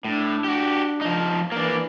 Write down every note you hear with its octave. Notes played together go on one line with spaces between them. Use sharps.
A2 D4
F#4 G4
F3 D#4
E3 A#3 D4